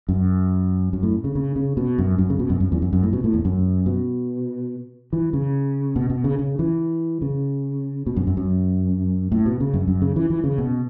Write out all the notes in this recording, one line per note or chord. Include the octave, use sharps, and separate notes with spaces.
F#2
F#2
A2
C#3
C#3
C#3
B2
F#2
F#2
C#3
B2
F#2
F#2
E2
F#2
F#2
A2
B2
A2
E2
F#2
B2
E3
C#3
B2
B2
C#3
C#3
E3
C#3
B2
F#2
F#2
F#2
A2
B2
C#3
F#2
F#2
C#3
E3
E3
C#3
B2